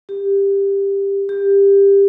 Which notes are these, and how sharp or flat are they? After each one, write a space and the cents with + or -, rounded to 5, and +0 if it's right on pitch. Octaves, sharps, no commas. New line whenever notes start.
G4 +15
G4 +20